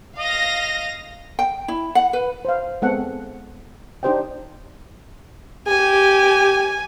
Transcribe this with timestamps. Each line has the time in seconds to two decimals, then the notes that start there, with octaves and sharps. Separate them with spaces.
0.19 D#5 F5 A#6
1.39 G5
1.68 E4
1.95 F#5
2.13 B4
2.45 C5 F5
2.82 G#3 B3 C4 A4 F#5
4.03 D4 D#4 G4 C5 D#5 G5
5.68 G4 G#5